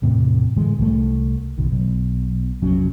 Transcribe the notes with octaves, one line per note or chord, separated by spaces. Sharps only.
E2 A2 C3
A2 D3 E3 G#3
C2 E3 A3
F#1 B1 D#3
B1
F1 A#1 F#3 C#4